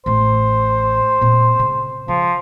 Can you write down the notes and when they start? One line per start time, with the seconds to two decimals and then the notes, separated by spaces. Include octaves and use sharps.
0.06 A1 A3 C5
1.21 A#2 C4
1.59 C#3
2.08 C#3 F3